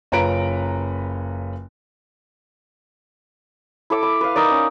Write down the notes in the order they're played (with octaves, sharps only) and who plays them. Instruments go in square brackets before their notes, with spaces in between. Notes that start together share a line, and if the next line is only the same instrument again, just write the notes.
[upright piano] F#1 C#4 F4 B4 A#5 D7
[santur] E4 A4 D6 E6
B5
B4 F5
D#4 A#4 D5
C#4